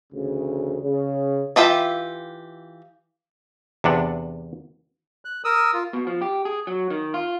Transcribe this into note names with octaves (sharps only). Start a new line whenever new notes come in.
A1 D2 C#3
C#3
E3 F4 G4 E5
E2 C3 D4 F#5
F#6
A#4 D#6 E6
F4
B2
F3
G4
G#4
F#3
D#3
F4